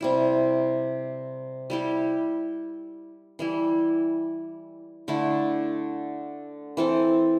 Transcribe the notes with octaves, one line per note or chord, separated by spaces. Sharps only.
C3 G3 E4
G3 E4 G4
E3 G3 E4
D3 A3 E4
E3 C4 A4